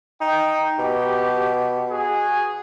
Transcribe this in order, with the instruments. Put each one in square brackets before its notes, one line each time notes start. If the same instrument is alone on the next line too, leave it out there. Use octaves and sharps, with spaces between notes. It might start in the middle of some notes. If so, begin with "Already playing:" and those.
[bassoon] D#4 [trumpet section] G5
[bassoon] B2 [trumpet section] G4
[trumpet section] F#4 G#4